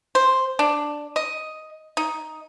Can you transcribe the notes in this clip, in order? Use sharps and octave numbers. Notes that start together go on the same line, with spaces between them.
C5
D4
D#5
D#4